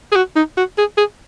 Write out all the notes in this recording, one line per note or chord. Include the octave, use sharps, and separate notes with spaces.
G#4
F#4
D#4
F#4
G#4
G#4